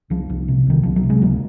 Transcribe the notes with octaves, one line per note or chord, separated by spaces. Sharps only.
C2 F3
C2
C3
C2 D#3
C2 F3
F#3
C3
G#3
C#2 F#3 A#3